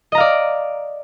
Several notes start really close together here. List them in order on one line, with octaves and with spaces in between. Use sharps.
D#5 A#5 F5 D5